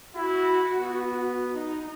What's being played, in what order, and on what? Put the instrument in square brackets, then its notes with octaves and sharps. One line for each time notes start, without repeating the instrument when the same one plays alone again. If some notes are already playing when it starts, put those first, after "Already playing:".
[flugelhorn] E4 [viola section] F#4
[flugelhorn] B3
[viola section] D#4